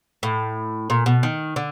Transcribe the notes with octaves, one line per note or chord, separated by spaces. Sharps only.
A2
A#2
B2
D#3
D3